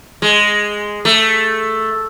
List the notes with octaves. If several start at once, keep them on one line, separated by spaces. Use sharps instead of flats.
G#3
A3